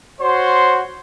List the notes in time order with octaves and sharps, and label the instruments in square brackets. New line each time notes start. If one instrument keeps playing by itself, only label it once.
[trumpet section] F#4 C5 C#5 C6